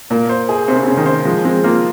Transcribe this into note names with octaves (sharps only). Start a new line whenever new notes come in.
A#2 A#3
C5
G#4
C3 C5
C#3
C3 C#4
D#3
C5
F3 G#3
G#3 C4
A#3 F4